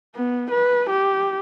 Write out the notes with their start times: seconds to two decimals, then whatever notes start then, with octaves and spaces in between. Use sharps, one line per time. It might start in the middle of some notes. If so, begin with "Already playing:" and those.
0.15 B3
0.50 B4
0.90 G4